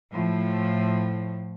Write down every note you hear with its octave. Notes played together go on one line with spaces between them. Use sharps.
A2 F3